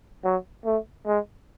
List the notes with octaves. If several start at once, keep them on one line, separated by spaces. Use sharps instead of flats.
F#3
A3
G#3